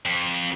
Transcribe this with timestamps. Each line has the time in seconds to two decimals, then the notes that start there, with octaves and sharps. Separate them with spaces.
0.05 F2